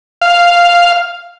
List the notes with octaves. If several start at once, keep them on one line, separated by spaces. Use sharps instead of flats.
F5